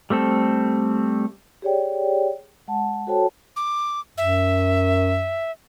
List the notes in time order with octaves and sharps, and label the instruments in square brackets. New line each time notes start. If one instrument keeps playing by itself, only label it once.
[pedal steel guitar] G3 A3 C4 A4
[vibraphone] G4 G#4 C#5 D5 G5
G#3 F#5 A5
F#4 A4 C5 C#5 G5 A5
[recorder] D6
[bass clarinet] F#2 [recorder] E5